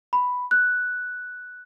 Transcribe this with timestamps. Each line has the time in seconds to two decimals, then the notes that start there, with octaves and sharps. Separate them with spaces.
0.13 B5
0.51 F#6